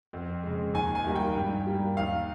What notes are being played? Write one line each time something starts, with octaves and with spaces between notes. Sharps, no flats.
F2
C#3 G#3
D#2 G#5
G#5
D#3 G3 A#3
G5
G2
G3 A#3
D#2 F5